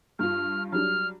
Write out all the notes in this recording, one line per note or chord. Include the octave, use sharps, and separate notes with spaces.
G2 F4 F6
F#3 G3 D4 F6